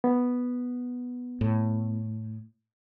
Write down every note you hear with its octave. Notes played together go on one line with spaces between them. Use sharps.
B3
A2